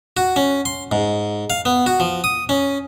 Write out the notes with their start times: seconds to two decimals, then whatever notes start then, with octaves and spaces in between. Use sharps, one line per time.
0.17 F#4
0.36 C#4
0.65 C6
0.92 G#2
1.50 F5
1.65 B3
1.86 F#4
2.00 F3
2.24 D#6
2.49 C#4